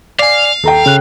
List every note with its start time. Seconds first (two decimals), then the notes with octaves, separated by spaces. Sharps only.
0.19 D5 F5 G#5
0.64 D#2 A4 G5 A#5
0.86 C#3 F#6